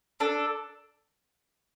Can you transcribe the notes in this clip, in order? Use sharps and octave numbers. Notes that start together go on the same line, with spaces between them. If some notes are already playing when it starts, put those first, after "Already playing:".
D4 A4